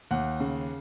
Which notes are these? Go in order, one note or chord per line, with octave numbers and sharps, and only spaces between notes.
D#2 F#5
C#3